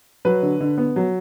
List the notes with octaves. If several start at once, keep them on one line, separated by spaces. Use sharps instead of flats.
F#3 B4
D3
D3
B3
F#3